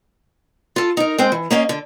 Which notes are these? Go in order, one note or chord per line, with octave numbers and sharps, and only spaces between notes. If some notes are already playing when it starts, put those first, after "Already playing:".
F4 A4
D#4 A#4
G#3 C4 G5
E3
A#3 C#4 D#5 F5
D3